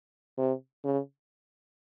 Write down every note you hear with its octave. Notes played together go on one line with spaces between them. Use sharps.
C3
C#3